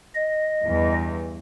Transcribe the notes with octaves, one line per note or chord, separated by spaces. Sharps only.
D#5
E2 G2 E3